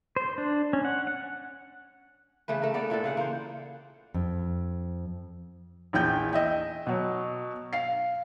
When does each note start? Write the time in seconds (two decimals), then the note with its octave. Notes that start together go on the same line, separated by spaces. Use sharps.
0.16 C5
0.38 D4
0.73 C#4
0.85 F#5
1.07 F#5
2.48 C#3 E3 A3 B4
2.62 A3 A#4
2.74 B3 A4 D5
2.90 A#2 E3 D4 A4
3.04 C#3 F5 F#5
3.17 A#3 C5
4.14 F2
5.93 A#1 E2 G5 G6
6.33 D#5 E5 G5
6.87 B2 F#3
7.73 F5 C7